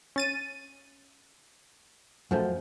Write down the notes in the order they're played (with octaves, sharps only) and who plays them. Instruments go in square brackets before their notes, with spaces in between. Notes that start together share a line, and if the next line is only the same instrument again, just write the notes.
[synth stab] C#4 A6 D#7
[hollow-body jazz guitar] F#2 F3 A3